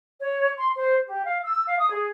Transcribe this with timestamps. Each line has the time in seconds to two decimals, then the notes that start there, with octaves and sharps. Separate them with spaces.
0.21 C#5
0.58 C6
0.75 C5
1.06 G4
1.25 F5
1.44 E6
1.66 F5
1.79 D#6
1.91 G#4